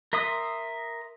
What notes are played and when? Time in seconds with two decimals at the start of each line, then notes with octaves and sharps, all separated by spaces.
0.13 A#4 E5 C6 D#6